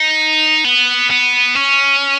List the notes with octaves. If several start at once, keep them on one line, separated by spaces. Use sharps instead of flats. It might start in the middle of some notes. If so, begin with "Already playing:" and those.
Already playing: D#4
B3
B3
C#4